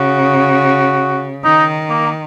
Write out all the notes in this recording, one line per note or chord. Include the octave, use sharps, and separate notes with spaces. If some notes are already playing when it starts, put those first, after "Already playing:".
Already playing: C#3 F#4
D#3 D#4
A#3